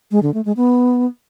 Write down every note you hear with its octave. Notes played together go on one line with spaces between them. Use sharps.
G#3
D3
A3
G#3
B3